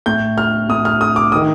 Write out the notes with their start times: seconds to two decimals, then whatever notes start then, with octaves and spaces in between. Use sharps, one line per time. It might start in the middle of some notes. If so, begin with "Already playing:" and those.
0.06 A2 G6
0.38 F6
0.69 A2 D#6
0.85 F6
1.01 D#6
1.16 D6
1.32 D#6
1.36 D#3